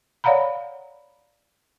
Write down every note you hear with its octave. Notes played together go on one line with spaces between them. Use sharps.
C#5 D5 F5 F#5 A#5 B5